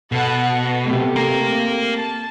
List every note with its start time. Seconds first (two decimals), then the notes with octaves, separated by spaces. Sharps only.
0.12 B2 A4 F#5
0.84 C3 A3 G4
1.16 A#3 A#4
1.93 A5